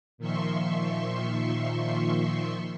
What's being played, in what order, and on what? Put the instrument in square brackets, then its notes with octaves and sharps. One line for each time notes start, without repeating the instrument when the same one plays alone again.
[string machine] A#2 D#3 F3 E5 C6 C#6